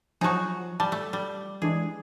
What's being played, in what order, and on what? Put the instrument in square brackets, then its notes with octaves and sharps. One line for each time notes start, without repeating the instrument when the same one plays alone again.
[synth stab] F3 F#3 [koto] D#4 F#4 [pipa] G#4 A5 C#6
[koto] G3 [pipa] A5
[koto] A3
G3
[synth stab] E3 G#3 D4 [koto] G#4